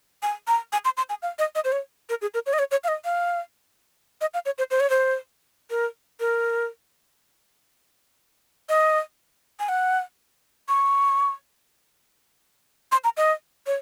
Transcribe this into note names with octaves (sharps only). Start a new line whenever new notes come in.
G#5
A#5
G#5
C6
C6
G#5
F5
D#5
D#5
C5
C#5
A#4
G#4
A#4
C#5
D#5
C#5
C#5
F5
D#5
F5
D#5
F5
C#5
C5
C5
C#5
C5
A#4
A#4
D#5
G#5
F#5
C#6
C6
A#5
D#5
C#5